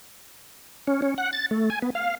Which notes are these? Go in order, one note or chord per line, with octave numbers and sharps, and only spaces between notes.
C#4
C#4
F#5
A6
A3
G#5
B3
F5